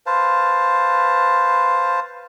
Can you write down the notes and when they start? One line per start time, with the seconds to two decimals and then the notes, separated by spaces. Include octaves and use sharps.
0.06 B4 C5 F5 A5